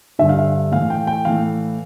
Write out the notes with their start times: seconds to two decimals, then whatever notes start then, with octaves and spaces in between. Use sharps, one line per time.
0.19 G2 D3 E5
0.29 F5
0.39 E5
0.72 A2 E3 F5
0.90 G5
1.07 G5
1.25 A2 E3 F5